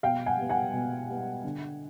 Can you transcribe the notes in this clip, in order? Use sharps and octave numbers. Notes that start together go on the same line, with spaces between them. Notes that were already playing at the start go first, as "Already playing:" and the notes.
B2 F5 G5
F#5 G#5
G3 B3
F#5 G#5
B2
G3 B3
D3